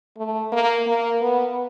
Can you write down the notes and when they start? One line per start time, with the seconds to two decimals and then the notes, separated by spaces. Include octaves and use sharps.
0.17 A3
0.52 A#3
0.87 A#3
1.21 B3